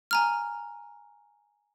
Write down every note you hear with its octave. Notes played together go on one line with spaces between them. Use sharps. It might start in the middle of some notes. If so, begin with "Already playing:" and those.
G#5 A#5 F6